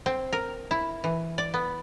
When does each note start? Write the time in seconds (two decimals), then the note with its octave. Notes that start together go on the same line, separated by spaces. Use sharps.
0.06 C4
0.33 A#4
0.71 E4
1.04 E3
1.38 D5
1.54 B3